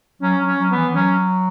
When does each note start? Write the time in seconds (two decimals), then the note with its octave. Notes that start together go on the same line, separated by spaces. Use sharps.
0.22 F#3 C#4
0.41 F#3
0.46 C#4
0.59 F#3
0.71 B3
0.76 E3
0.94 F#3 C#4